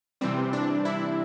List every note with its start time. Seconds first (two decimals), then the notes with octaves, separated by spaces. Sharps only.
0.21 C3 E3 G3 C4
0.53 D4
0.85 E4